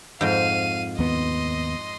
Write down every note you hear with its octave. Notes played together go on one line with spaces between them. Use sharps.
F2 G#2 F5 D#7
D#2 B3 D#5 C6